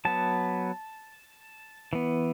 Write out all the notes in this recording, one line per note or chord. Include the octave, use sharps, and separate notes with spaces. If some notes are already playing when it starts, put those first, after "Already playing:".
F#3 B3 A5
E3 B3